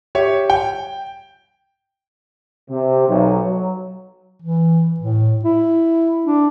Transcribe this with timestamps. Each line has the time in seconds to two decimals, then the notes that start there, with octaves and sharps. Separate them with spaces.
0.15 G4 C#5 E5
0.50 G5
2.69 C3
3.08 B1
3.44 F#3
4.42 E3
5.00 A2
5.45 E4
6.26 D4